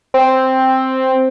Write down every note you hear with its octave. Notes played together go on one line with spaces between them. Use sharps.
C4